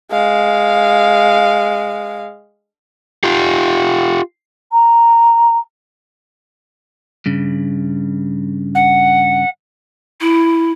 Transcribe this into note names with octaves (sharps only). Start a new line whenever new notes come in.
G#3 F5
F4 G4
A#5
G2 C#3
F#5
E4